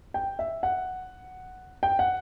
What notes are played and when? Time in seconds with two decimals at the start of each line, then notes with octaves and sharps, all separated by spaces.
0.14 G5
0.39 E5
0.63 F#5
1.83 G5
1.99 F#5